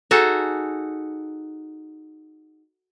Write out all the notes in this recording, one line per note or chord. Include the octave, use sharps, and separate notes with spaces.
D#4 F#4 G#4 A4